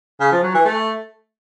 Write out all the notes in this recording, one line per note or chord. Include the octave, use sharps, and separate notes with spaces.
C#3
F3
F#3
E3
A3